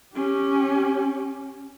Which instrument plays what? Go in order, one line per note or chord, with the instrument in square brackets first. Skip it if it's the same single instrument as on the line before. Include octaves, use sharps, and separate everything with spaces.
[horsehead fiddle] C#4 G4